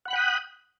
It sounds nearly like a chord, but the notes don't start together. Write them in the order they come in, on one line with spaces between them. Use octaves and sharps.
F#5 B5 F#6 G5 D#6